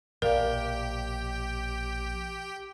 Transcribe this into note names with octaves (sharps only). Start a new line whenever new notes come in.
A#1 B2 G4 A#4 D5 F5 G5